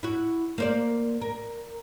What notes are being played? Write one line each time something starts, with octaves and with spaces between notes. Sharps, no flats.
E4 F#4
A#3 C5 D5
A#4